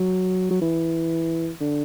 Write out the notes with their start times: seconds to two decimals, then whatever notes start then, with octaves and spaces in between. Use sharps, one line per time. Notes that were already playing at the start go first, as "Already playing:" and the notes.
Already playing: F#3
0.51 F#3
0.61 E3
1.60 D3